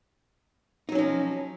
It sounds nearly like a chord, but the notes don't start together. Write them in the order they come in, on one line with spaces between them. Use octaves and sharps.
D#4 F#3 C#4 F3